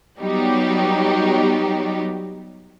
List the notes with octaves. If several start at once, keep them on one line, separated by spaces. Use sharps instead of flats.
F#3 G3 B3 D#4 G4